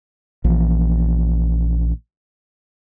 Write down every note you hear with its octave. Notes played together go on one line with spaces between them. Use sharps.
A#1 E3